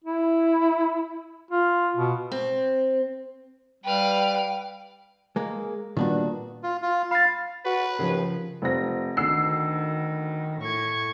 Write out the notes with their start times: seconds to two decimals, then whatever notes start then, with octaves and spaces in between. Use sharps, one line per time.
0.04 E4
1.51 F4
1.97 B2
2.32 C4
3.84 G3 B4 F5 G5
5.36 G#3 A#3
5.97 A#2 D#3 G3 B3 D4 F#4
6.63 F4
6.82 F4
7.11 F5 B5 A6
7.65 F#4 B4
7.99 D#2 C#3 F3
8.62 F1 C4 A#6
9.17 D2 D#3 E6 C7
10.62 A2 C#6 G#6